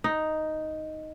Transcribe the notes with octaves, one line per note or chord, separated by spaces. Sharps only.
D#4